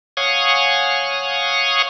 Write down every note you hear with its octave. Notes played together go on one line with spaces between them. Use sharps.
C#5 F5 F#5 G#5 C#6 D#6